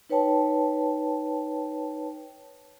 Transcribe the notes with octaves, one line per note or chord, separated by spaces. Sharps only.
D#4 B4 C#5 G5 A5